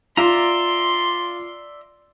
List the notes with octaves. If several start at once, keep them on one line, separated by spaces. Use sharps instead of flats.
F4 D5 E5 A#5 C6